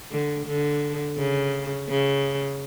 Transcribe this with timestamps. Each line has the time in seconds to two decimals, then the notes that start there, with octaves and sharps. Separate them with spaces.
0.12 D3
0.47 D3
1.17 C#3
1.89 C#3